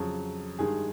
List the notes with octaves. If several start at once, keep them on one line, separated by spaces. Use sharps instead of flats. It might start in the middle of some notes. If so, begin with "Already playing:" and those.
Already playing: F2 C#3 F#3
G2 D#3 G#3 G#4